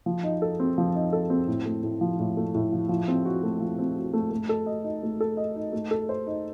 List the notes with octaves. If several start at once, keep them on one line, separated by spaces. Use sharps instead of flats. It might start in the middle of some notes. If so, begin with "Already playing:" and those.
F3
D#4
A4
C4
F3
D#4
A4
C4
A2
A3
A2
F3
A2
A3
A2
F3
F3
C4
F#4
A3
F3
C4
F#4
A3
A3
A4
D#5
D#4
A3
A4
D#5
D#4
A3
A4
C5
D#4